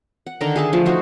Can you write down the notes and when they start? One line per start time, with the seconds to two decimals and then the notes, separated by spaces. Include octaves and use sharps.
0.26 F#5
0.41 D3 D#3 A#4 A#5
0.56 G#4 E5 A5
0.73 F3 A3
0.86 D#4 F#4 C5